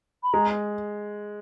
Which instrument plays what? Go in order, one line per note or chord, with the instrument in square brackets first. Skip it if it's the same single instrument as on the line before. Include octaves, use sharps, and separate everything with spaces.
[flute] B5
[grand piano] G#3 [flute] A#5